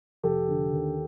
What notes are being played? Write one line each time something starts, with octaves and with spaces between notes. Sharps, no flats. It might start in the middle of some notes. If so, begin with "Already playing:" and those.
F1 G4 A4
D3
D#2